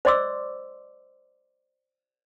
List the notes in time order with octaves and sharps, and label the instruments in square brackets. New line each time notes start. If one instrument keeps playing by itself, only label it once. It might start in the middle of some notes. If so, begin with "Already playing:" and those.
[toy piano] C5 D5 D#5 C6 D6 E6